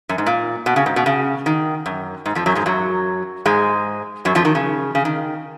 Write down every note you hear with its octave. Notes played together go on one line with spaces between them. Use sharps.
F#2
G#2
A#2
B2
C#3
G#2
B2
C#3
D#3
F#2
G#2
F2 F3
F#2 F#3
G#2 G#3
F#2 F#3
G#2 G#3
F#2 F#3
F2 F3
D#3
C#3
C#3
D#3